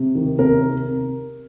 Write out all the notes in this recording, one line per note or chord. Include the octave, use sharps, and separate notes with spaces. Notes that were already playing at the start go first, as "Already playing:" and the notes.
Already playing: C3
D#3
C3 A#4